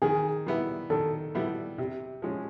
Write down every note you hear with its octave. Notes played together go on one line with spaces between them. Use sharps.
D#3 G#4
G3 B3 E4
D#3 A4
G3 B3 E4
C3
F3 G#3 C#4